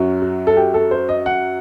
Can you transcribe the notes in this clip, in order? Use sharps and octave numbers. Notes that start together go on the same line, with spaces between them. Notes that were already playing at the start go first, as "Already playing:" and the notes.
Already playing: F#2 F#3
F#4
A4
G4
A4
C5
D#5
F#5